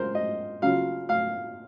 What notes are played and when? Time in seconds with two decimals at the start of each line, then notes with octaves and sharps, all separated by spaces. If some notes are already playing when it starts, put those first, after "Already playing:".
Already playing: C#3 G#3 F4 A#4 C5
0.15 D#5
0.62 C#3 F#3 C#4 F4 F5
1.09 F5